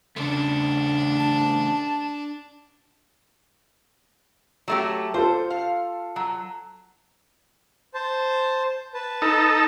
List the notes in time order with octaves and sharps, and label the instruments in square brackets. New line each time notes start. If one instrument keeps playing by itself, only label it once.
[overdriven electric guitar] C#3 A3 [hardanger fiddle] D4
[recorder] A5
[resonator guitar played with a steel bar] F#3 A3 G4
[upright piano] F4 A4 [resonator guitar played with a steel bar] C5
[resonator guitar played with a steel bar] F5
F#3
[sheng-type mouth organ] C5 A5
B4 A5
[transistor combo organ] D#4 A4